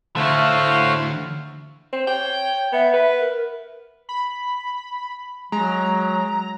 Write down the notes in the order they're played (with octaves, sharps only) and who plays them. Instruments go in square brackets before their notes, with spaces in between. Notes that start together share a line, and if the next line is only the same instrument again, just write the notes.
[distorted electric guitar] D2 [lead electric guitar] A3 E4 [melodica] F#4 C5 [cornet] F5
[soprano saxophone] C4
[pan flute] C#5 [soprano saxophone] G5
[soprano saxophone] B3 [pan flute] E5
[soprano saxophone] B4
[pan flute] A#4
[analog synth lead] B5
[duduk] F#3 [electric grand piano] G#3 [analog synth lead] A#5